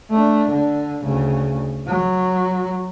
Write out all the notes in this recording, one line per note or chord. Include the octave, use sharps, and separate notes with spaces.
A3 D4
D3
D2 C#3
F#3